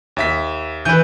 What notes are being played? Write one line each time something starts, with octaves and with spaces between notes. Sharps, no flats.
D#2 E5 B6
E3 B4 G6